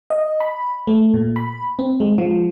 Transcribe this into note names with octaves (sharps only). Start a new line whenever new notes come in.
D#5
B5
A3
A#2
B5
C4
G#3
F3